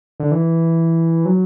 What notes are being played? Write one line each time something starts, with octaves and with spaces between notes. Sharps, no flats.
D3
E3
F#3